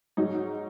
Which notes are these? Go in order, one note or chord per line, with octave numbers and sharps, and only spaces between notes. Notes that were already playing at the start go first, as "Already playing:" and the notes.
G#2 F#3 D#4